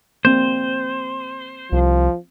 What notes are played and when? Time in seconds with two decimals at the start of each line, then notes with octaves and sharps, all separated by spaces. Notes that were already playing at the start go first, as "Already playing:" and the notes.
0.25 A#3 C4 C5
1.72 C2 F3